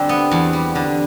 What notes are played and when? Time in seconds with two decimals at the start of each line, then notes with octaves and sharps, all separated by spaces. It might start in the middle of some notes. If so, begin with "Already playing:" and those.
Already playing: D3 G3 C4
0.09 B3
0.31 E2
0.53 G3
0.75 D3